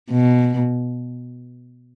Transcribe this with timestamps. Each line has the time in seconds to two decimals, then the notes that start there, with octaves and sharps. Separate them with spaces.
0.11 B2